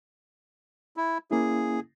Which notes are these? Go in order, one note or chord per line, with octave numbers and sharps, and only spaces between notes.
E4
A#3 C#4 E4 G#4